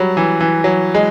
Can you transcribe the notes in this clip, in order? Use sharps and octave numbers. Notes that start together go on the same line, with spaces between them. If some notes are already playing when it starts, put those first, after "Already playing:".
Already playing: F#3 G3
E3
E3
F#3
G#3